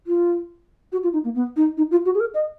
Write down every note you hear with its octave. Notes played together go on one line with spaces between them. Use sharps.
F4
F#4
F4
D#4
A#3
B3
D#4
D#4
F4
F#4
G#4
A#4
D#5